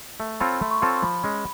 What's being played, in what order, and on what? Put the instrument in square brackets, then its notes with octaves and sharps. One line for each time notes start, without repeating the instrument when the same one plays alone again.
[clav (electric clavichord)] A3
[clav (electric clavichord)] C4 F4 A4 C#5 [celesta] B5
[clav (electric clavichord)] A3 [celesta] C6
[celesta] C#6
[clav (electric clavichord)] C4 F4 A4 C#5 [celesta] C6
[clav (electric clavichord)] F3 [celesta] B5
[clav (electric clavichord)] G#3 C#4